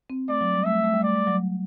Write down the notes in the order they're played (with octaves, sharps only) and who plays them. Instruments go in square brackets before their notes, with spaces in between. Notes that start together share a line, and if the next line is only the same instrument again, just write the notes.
[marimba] C4
[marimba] A3 [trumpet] D5
[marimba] F#3
G3
[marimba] A3 [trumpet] E5
[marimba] A3
G3
[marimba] A3 [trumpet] D5
[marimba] G3
F#3